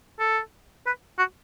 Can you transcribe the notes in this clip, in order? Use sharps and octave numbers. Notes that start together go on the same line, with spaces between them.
A4
B4
F#4